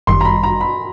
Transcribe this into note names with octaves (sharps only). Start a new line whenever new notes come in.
G1 F#2 D#3 G3 C6
A#5
B5
A#5
B5